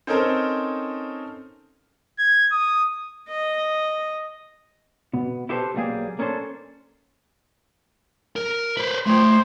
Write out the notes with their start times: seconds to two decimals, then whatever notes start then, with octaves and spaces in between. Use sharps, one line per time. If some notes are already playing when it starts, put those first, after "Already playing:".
0.07 C4 C#4 D#4 A4 A#4 C5
2.19 G#6
2.51 D#6
3.29 D#5
5.13 B2 B3
5.49 E4 G4 A4 B4 C5 A5
5.75 B1 G3 A#3 G#4
6.19 A#3 C#4 D4 A4 C5
8.36 A#4
8.77 B4 C5
9.07 A3 C5 G5